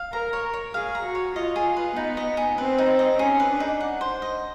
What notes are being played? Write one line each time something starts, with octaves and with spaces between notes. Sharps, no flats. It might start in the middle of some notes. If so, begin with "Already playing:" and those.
Already playing: F5
A#4 A#5
C#5
C#5
G#4 F5
A#5
F#4
C#5
F4 D#5
G#4
B4
B3 D#4
D#5
G#4
C4 B4
D#4
D#5
C#4 G#4
B4
D4
D#4
F#5
C5
D#5